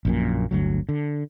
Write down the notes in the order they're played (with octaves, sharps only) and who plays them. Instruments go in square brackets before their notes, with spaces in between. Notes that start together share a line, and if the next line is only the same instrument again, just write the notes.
[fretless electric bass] A#1 F#2 A#2
G1 D2 F#3
D3